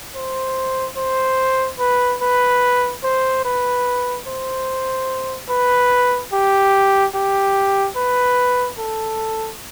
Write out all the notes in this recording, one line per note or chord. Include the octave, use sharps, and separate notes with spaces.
C5
C5
B4
B4
C5
B4
C5
B4
G4
G4
B4
A4